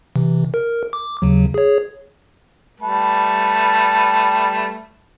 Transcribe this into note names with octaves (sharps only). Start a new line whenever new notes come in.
C3 E3
A#4
D6
D#2 C#3 F#3
G#4 C#5
G3 A3 B4